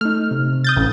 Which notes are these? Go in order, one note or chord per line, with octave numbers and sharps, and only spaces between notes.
A3 D#4 F6
C3
D#6 G6 A6
A1